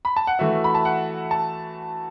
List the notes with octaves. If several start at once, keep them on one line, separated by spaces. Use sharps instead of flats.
B5
A5
F#5
E3 A3 F#4 E5
B5
A5
F#5
A5